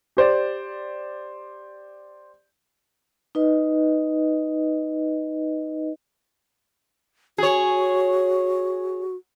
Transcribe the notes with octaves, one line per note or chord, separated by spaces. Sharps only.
G4 C5 D5
D#4 B4 D#5
F#4 G#4 C#5